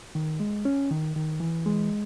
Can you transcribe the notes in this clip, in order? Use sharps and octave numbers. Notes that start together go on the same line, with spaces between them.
D#3
G#3
C#4
D#3
D#3
E3
G#3